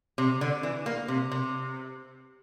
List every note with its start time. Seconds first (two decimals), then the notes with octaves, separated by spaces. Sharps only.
0.18 C3
0.41 D3
0.63 E3
0.86 A#3
1.08 C3
1.31 C3